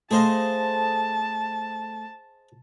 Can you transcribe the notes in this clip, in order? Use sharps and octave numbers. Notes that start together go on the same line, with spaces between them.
A3 G#4 C5 D#5 F5 A5